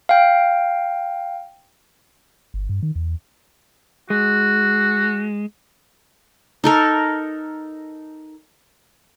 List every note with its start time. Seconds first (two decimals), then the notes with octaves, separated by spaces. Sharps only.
0.09 F5 G5
2.54 G1
2.69 G2
2.83 D#3
2.96 E2
4.10 G#3 F#4
6.64 D#4 A4 A#4